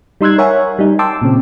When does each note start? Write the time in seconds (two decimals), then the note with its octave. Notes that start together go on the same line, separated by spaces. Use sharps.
0.21 G3 D#4 C6 E6 F#6 G#6
0.38 A#4 C#5 E5 F#5 G#5
0.79 G3 D#4
0.99 G5 A5 C6 D6 E6
1.22 A#2 C#3 C4